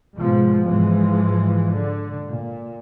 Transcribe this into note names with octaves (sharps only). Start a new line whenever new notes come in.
G#2 B2 F3 G#3
G#2 E3 F3 G#3
D3
A#2